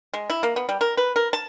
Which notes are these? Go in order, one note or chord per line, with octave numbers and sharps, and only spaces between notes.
G#3
E4
A#3
B3
G3
A#4
B4
A#4
A5